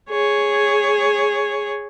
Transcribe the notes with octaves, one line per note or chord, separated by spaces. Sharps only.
G#4 C#5